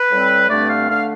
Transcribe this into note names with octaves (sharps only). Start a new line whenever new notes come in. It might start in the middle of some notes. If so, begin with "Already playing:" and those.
Already playing: B4
A2 G3 C4
G2 D3 A3 C4 D5
F5
D3 A3 F5